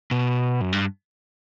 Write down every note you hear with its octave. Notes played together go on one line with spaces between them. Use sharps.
B2
F#2
G2